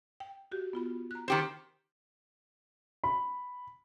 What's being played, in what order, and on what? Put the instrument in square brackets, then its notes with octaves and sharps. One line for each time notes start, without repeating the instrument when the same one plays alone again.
[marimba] G5
F#4 G4
B3 F4 B5
A#5 F#6
[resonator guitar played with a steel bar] D#3 G4 C5
[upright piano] B5